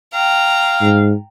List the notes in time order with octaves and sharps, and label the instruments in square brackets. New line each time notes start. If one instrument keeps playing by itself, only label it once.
[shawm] F5 [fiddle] G5 A#5
[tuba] G#2